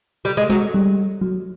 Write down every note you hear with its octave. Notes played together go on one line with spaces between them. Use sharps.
G3
G#3
F#3 G#3
G3
F#3